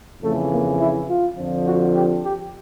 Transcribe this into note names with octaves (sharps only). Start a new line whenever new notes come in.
F2 C#3 E3 A3
A#3
E4
F4
F2 D3 F3
F#4
G4
G4